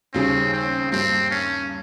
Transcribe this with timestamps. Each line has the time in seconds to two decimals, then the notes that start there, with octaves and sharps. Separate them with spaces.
0.14 D#2 C#3 G3 C4 C#4 G#4
0.53 C4
0.92 G2 G3 A#3 C4
1.31 C#4